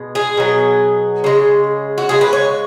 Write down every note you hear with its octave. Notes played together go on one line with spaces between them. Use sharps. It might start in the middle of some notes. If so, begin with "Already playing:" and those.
Already playing: B2 G#3
G#4
B2 F#3
C#3 G#3
F#4
C#3 G#3 G#4
B4
C#5